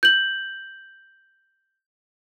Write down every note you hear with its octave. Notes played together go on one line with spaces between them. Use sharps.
G6 F#7